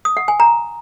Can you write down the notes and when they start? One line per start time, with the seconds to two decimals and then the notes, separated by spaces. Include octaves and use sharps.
0.05 D#6
0.17 F#5
0.28 G#5
0.40 A#5